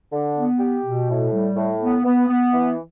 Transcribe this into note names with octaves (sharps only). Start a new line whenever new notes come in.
D3
B3
G4
B2
A2
G3
A2
B3
B3
B3
E3